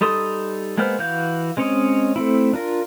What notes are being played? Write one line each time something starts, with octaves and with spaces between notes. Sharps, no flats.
G3 D#4 A4 C6 D#6
G#3 A#3 B3 C5 F6
E3 F#4 F5 G6
G#3 C4 C#4 C#5 D#5
A3 C4 E4
D4 F4 A#4